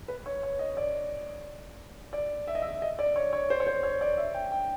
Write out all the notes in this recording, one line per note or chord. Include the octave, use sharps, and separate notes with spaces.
B4
C#5
C#5
D#5
D5
D5
E5
D#5
E5
D#5
D5
C#5
C#5
C5
C#5
C5
C#5
D5
E5
G5
G5